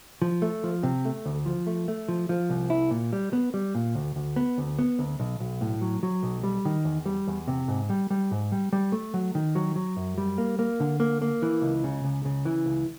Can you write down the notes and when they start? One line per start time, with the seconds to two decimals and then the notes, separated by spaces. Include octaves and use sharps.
0.22 F3
0.42 A3
0.64 F3
0.83 C3
1.05 A3
1.26 D2
1.46 F3
1.67 A3
1.88 A3
2.09 F3
2.29 F3
2.50 C2
2.70 E4
2.91 A#2
3.13 G3
3.33 B3
3.54 G3
3.75 A#2
3.95 D2
4.16 D2
4.36 B3
4.58 D2
4.79 B3
4.99 D2
5.20 B1
5.40 B1
5.61 A2
5.81 F#3
6.03 F#3
6.23 B1
6.44 G3
6.65 D#3
6.85 E2
7.06 G3
7.27 E2
7.48 C3
7.68 G#2
7.90 G3
8.10 G3
8.31 G#2
8.52 G3
8.73 G3
8.92 A3
9.14 F#3
9.35 D#3
9.55 F#3
9.76 F#3
9.96 F#2
10.18 G3
10.38 A#3
10.59 A#3
10.80 D3
11.00 A#3
11.22 A#3
11.42 E3
11.62 C#2
11.84 C#3
12.04 C#2
12.25 C#3
12.45 E3
12.66 C#2